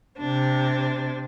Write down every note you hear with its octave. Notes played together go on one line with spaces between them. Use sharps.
C3 D4